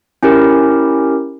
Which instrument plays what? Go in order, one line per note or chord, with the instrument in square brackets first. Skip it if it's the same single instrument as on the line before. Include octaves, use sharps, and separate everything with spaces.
[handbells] C#4 E4 G4 A#4